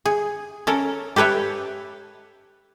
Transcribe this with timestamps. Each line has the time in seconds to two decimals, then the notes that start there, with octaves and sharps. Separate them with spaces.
0.06 G#4
0.67 C#4 A4 A#4
1.16 G4 A4 B4 C#5 E5